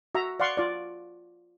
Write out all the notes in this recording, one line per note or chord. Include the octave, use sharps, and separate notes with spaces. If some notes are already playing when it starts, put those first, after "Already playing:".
F#4 E5 A#5
D5 F5 F#5 C6 C#6
F4 D5